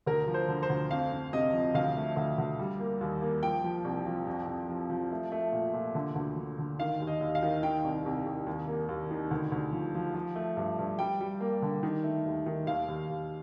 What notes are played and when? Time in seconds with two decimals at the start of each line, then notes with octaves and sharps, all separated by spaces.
0.06 D2 A#4
0.28 F3
0.34 C5
0.48 D3
0.63 C5
0.70 D2
0.90 F2 F5
1.12 F2
1.33 C3 D#5
1.53 F3
1.74 D2 F5
1.96 A3
2.16 D2
2.38 D2
2.59 G3
2.80 A#3
3.01 D#2
3.22 A#3
3.42 F3 G5
3.64 F3
3.85 C2
4.06 F3
4.27 F2
4.47 F2
4.69 F3
4.90 F3
5.11 A3
5.32 A3
5.52 A#2
5.73 A#2
5.95 D3
6.15 D2
6.37 D3
6.59 D3
6.79 D#3 F5
7.00 D#2
7.07 D#5
7.21 D#2
7.35 F5
7.43 D#3
7.63 D#3 G5
7.84 C2
8.06 C2
8.26 C2
8.47 D#2
8.67 A#3
8.89 D#2
9.11 D#3
9.31 D2
9.52 D2
9.72 F3
9.95 F3
10.15 F3
10.35 A3
10.57 G2
10.79 G2
10.99 G3 G5
11.21 G3
11.40 A#3
11.62 D3
11.83 D#3
12.04 A3
12.25 D#2
12.46 D#3
12.67 D#2 F5
12.88 D#2
13.09 D#2